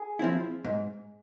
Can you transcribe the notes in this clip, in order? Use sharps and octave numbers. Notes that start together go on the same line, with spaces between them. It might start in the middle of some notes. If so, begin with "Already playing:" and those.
Already playing: G#4
F3 C4 E4
G#2